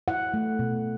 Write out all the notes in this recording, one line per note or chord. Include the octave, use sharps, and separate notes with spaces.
E4 F#5
A3
B2